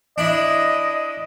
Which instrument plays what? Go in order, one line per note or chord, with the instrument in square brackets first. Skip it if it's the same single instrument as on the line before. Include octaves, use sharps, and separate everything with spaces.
[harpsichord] D4 E4 [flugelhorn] D#5